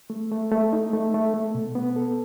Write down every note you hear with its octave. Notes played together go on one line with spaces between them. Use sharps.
A3
A3
A3
D#4
A3
A3
A3
B2
B3
A4